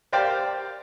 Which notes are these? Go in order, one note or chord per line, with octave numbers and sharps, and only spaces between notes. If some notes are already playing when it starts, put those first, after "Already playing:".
G4 A#4 C5 D5 F5 G5